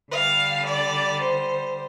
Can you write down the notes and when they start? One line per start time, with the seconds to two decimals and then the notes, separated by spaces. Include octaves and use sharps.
0.10 D3 G3 F5
0.66 D5
1.22 C5